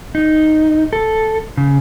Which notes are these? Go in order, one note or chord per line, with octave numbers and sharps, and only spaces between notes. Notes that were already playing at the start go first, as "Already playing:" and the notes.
D#4
A4
C#3